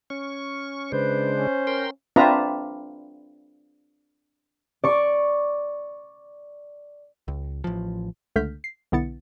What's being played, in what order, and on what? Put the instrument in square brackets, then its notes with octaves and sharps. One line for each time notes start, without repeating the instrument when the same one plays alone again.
[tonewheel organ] C#4 C#6
[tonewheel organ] C#3 G#3 D4 [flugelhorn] B4 [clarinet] C5
[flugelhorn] C#4
[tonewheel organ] A#4 G5 C6
[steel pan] C4 D4 F4 B4 E5 A#5
[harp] D5 C#6
[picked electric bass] C#2
A1 F3
[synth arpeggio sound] C#2 D3 A3 F6 G6 B6
C7
B1 D3 B3 E4 A6 C#7